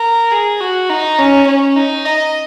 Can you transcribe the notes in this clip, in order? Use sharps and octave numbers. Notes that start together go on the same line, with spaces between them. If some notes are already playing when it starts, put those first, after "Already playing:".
Already playing: A#4
G#4
F#4
D#4
C#4
C#4
D#4
D#5